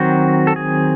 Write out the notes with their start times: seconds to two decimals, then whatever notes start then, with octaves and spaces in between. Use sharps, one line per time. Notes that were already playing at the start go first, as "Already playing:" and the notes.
Already playing: D#3 F#3 C4 F#4
0.47 A4
0.56 G#4